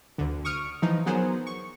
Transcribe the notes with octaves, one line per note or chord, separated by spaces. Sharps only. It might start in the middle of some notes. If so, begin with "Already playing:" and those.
D2 D3
C#6 D#6 F6 D7
E3 F3 D#4
F#3 B3 G#4 A#4 C5
C#6